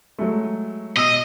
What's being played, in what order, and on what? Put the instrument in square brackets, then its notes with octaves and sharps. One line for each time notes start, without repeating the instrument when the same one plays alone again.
[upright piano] F#3 G#3 A3
[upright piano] B2 E6 [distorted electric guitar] D#5